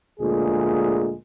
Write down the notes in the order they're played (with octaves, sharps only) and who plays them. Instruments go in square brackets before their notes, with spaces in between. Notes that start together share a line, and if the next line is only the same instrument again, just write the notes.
[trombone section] D2 A#2 G#3 G#4